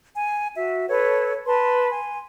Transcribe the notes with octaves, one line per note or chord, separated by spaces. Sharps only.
G#5
F#4 E5
A4 B4 C#5
B4 A5 C6
G#5 C6